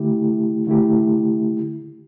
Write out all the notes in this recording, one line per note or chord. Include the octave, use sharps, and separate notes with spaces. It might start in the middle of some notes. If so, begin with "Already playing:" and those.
Already playing: D3 A3 E4 G4
D3 A3 E4 G4